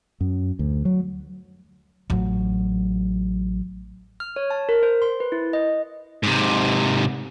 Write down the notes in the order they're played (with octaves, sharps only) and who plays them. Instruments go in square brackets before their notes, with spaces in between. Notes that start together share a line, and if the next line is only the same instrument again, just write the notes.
[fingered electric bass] F#2
D2
F#3
[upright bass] A1 F#3
[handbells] F6
C#5
A5
A#4
C5
C6
B4
E4
D#5
[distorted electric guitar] G#2 C3